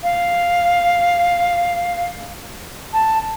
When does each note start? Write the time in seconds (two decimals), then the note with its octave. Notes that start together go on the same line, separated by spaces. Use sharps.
0.03 F5
2.93 A5